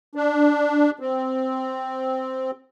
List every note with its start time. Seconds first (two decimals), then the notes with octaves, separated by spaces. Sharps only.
0.15 D4
1.00 C4